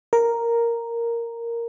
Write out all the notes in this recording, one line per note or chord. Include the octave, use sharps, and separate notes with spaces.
A#4